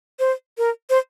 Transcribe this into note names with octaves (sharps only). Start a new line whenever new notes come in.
C5
A#4
C5